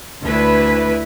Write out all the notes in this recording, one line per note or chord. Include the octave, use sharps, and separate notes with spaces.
D2 E4 B4